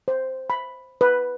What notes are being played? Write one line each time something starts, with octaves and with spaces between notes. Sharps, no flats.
C5
B5
B4